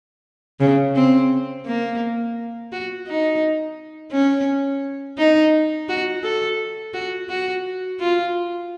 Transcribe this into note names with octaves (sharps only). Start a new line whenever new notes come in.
C#3
C4
A#3
F#4
D#4
C#4
D#4
F#4
A4
F#4
F#4
F4